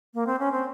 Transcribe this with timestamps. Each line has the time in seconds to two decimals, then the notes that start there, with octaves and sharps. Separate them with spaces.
0.14 A#3
0.27 C4
0.39 C#4
0.52 C4